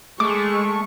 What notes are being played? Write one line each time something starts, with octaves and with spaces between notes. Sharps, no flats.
G#3 A3 C#6 D6